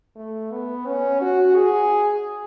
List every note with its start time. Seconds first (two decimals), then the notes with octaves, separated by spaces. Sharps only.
0.16 A3
0.52 B3
0.87 C#4
1.21 F#4
1.56 G#4